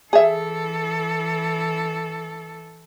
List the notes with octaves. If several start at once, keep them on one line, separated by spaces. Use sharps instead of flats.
E3 G#4 A4 E5